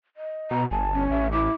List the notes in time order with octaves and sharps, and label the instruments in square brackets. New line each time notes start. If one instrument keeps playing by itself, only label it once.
[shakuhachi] D#5
[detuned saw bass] B2 [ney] A#5
[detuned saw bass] G1 [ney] G#5 [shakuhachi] A5
[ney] C#4
[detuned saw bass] A1 [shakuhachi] E5
[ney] E4 [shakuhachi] D6